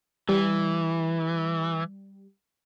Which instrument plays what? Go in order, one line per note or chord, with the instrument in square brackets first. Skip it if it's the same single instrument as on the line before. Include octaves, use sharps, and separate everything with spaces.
[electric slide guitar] E3 [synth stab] G3